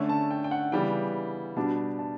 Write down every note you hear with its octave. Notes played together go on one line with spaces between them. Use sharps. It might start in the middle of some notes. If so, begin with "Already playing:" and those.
Already playing: D3 A3 C#4
A5
G5
G5
F#5
C#3 E3 G3 B3 G5
B2 G3 D4 A5
A5